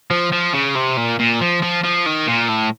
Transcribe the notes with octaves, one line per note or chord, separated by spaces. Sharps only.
F3
F3
C#3
C3
A#2
A#2
F3
F3
F3
D#3
A#2
A2